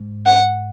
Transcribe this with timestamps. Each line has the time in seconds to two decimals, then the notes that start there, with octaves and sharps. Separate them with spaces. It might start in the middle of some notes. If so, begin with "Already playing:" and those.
Already playing: G#2
0.26 F#5